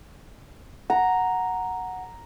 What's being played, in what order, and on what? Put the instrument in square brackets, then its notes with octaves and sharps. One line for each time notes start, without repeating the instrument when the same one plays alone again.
[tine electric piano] F#5 [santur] A#5